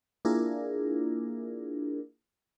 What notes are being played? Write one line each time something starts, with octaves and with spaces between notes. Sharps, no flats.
A#3 D4 E4 F4 G#4 A#4